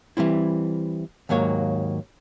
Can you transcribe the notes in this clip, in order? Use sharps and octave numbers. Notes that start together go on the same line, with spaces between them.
E3 G3 C4 E4
D#2 G#2 F#3 A#3 C#5